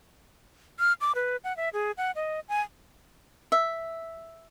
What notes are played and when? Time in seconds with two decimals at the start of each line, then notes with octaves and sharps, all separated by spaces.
0.79 F6
1.01 D6
1.15 B4
1.44 F#5
1.57 E5
1.73 G#4
1.97 F#5
2.16 D#5
2.49 G#5
3.52 E5